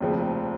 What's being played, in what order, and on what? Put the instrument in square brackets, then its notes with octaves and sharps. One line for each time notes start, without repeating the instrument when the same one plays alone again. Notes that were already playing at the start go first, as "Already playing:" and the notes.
[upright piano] F1 D#2 C#3 F3 C4